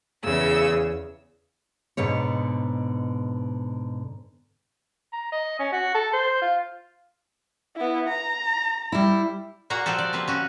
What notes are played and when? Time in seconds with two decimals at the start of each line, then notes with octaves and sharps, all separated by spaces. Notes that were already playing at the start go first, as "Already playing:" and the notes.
0.24 E2 C#3 E6
1.97 G#2 B2 D3 C#5
5.13 A#5
5.32 D#5
5.59 C#4
5.72 F#4
5.95 A4
6.13 C5
6.42 F4
7.76 B3 E4
8.08 A#5
8.92 G3 E4
9.70 A#2 A#3 F#4 A#5
9.86 F3 F#4 G4 A4
9.98 D5
10.13 A#3 C4 B4
10.28 C#4 F#4